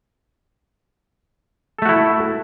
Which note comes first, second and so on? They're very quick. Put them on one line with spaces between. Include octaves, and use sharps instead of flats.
A4 A3 F#4 E4